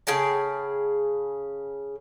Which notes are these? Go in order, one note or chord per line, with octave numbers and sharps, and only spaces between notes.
C#3 G#4 G5 A5